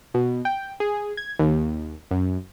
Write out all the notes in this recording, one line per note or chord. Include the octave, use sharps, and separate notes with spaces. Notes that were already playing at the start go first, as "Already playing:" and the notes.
B2
G5
G#4
G#6
D#2
F#2